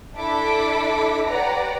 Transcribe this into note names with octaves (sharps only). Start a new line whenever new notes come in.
D4 E4 A4 A5 D6 B6
G4 B4 C#5 D5 F#5 A#5